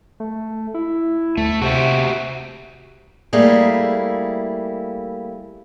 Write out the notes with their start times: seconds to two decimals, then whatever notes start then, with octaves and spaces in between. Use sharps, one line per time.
0.20 A3
0.74 E4
1.37 D2 A3
1.62 C3 F#4 C5 E5
3.33 G3 A3 A#3 E4 G#4